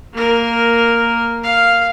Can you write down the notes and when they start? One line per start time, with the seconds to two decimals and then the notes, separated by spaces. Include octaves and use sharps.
0.13 A#3 A#4
1.44 F5